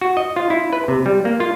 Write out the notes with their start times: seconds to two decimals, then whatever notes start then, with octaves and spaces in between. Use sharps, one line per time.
0.01 F#4
0.17 D#5
0.36 F4
0.50 E4
0.73 B4
0.88 C3
1.06 G3
1.25 A#3
1.40 F4